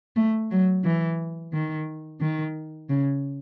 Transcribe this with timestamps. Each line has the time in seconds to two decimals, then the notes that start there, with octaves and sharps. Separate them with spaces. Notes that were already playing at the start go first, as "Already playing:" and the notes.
0.16 A3
0.51 F#3
0.84 E3
1.53 D#3
2.21 D#3
2.89 C#3